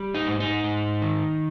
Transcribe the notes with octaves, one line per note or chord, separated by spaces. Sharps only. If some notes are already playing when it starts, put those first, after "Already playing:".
Already playing: G3
D#4
G#2
D#4
G#2
D#3